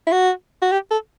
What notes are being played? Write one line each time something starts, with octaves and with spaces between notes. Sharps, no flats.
E4
F#4
F#4
G4
A4